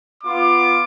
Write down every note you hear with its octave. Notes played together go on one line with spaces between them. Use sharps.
B3 F4 D6